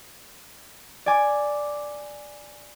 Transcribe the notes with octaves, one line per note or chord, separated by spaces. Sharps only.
D5 G#5 D6